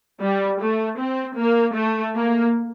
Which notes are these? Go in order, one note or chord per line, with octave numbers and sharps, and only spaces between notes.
G3
A3
C4
A#3
A3
A#3